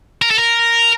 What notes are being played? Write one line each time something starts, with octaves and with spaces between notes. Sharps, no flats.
A#4
A4
A#4